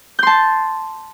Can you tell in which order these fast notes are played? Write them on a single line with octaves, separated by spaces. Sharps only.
G6 C6 A5